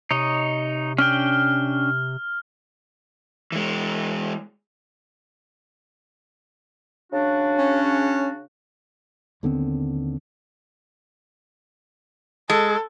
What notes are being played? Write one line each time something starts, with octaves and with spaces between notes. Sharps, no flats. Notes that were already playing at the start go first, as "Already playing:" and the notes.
C3 D#4 C#5 D#5
C#4 D4 G5 F6
E3 G#3
C#3 D4 F#4
C#4
D#2 D3 B3 C4
G#3 A4